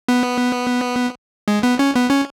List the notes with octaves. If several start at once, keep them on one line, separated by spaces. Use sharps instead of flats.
B3
G#3
B3
C#4
B3
C#4